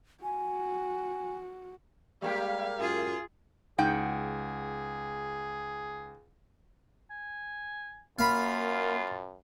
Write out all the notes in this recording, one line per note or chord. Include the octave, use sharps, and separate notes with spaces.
F#4 G#5
G3 G#3 A#3 G4 F5
F#2 F4 G#4
C#2 D#4 G#4 F#5 G5
G#5
F#2 A#3 F4 F5 B5